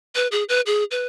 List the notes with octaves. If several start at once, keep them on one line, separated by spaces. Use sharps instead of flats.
B4
G#4
B4
G#4
B4